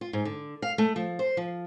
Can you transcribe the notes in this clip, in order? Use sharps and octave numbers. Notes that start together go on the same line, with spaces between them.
F4
G#2
D3
F5
A3
F3
C5
F3